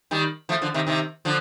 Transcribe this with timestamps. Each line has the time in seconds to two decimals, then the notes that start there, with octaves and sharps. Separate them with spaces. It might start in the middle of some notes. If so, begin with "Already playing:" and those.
0.11 D#3 G3
0.49 F3 A3
0.62 D3 F3
0.74 C3 D#3
0.87 C3 D#3
1.25 D3 F3